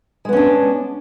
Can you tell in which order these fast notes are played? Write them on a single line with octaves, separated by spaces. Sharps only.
G#3 B3 C#4 D4